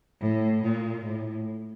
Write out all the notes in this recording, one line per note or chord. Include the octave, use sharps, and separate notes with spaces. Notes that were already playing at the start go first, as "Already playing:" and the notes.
A2
A#2
A2